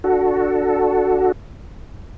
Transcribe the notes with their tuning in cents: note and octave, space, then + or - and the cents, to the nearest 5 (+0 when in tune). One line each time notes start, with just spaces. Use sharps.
D4 +0 F#4 +0 A4 +0